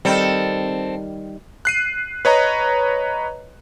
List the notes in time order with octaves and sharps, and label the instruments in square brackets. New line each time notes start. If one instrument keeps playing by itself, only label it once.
[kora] D#3 G3 [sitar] C4 A4
[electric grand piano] F#6 C7 D#7
B4 C#5 D#5 A#5